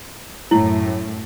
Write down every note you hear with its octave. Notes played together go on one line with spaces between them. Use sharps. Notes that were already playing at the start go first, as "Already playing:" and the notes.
F#2 A2 E4